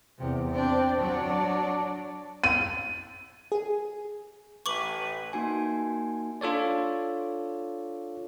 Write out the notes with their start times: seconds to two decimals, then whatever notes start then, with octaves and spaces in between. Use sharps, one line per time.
0.18 E2 C3
0.51 C4 D4
1.00 F#3 D4
2.44 D#7
3.52 G#4
4.66 A1 B4 C#6 D6 F#7
5.33 A#3 D#4 F#4 G#5
6.41 D4 F4 A4 C#5 D5